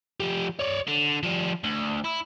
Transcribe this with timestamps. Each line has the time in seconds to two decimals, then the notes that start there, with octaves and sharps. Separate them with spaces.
0.20 F3 G4
0.59 C#5 D5
0.88 D3
1.23 F3 G3
1.64 D2
2.04 E4